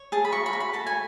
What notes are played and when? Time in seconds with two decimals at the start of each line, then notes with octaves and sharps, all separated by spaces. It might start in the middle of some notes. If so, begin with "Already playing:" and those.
Already playing: C#5
0.12 G#4 A5
0.25 B5
0.32 F#4 C#6
0.46 B5
0.53 F#4
0.60 B5
0.73 A4 A5
0.87 G#5